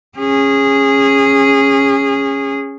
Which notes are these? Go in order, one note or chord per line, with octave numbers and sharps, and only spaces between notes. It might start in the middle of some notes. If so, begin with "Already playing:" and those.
C#4 G#4